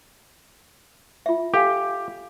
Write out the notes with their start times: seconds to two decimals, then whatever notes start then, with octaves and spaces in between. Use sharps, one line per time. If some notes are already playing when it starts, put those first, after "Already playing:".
1.26 F4 E5
1.54 G4 A4 F5 G#5